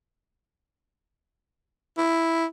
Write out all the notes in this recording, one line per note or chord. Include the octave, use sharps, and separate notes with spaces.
E4